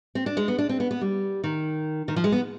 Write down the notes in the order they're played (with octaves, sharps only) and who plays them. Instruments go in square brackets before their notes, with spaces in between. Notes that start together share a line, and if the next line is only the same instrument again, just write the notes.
[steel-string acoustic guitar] C4
D4
G#3
B3
D4
C4
B3
B3
G3
D#3
D#3
F3
G#3
B3